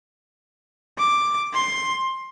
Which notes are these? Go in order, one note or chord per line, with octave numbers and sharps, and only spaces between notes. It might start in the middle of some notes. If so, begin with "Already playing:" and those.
D6
C6